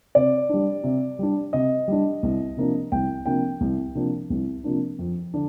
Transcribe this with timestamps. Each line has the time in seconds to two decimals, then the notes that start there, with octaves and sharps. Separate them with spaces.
0.15 C3 D5
0.49 G3 D4
0.84 C3
1.19 G3 D4
1.53 C3 D#5
1.88 G3 D4
2.23 C2
2.57 C3 F3 A#3 D4
2.92 C2 G5
3.26 C3 F3 A#3 D4 G5
3.61 C2
3.95 C3 F3 A#3 D4
4.30 C2
4.64 C3 F3 A#3 D4
4.99 F2
5.34 D3 D4